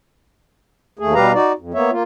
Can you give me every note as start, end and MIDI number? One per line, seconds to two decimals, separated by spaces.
0.99 1.14 39
0.99 1.14 57
0.99 1.14 68
1.15 1.32 47
1.15 1.32 55
1.15 1.32 67
1.15 1.32 71
1.15 1.32 77
1.15 1.32 82
1.33 1.52 63
1.33 1.52 66
1.33 1.52 74
1.59 1.72 41
1.74 1.91 58
1.74 1.91 59
1.74 1.91 73
1.74 1.91 76
1.91 2.03 58
1.91 2.03 65